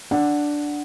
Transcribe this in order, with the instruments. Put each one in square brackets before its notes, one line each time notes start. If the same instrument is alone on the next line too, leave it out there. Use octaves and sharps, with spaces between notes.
[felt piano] D4 F#5